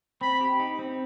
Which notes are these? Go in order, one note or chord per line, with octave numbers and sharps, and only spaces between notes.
C4 B5
G4
D#4
C4